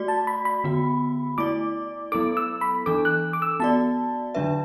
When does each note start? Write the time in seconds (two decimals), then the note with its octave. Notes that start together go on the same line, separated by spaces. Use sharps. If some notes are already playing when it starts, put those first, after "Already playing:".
Already playing: A3 F#4 D5
0.08 A5
0.27 B5
0.45 B5
0.64 D3 B3 F#4
1.38 A3 E4 D5 D6
2.12 F#3 B3 E4 A4 D6
2.37 E6
2.61 B5
2.86 E3 D4 A4 D6
3.05 F#6
3.33 D6
3.42 E6
3.60 B3 F#4 D5 A5
4.35 D3 F#3 D4 B4 E5